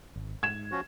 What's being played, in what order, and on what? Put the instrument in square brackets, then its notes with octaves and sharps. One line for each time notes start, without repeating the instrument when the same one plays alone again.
[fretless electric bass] G#1
[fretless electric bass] G#2 [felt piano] G#6 E7
[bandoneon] F3 C#4 F#4